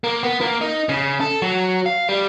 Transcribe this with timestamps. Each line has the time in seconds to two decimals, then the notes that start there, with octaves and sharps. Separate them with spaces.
0.04 A#3
0.23 B3
0.41 A#3
0.61 D#4
0.89 C#3
1.21 A4
1.42 F#3
1.86 F5
2.08 G3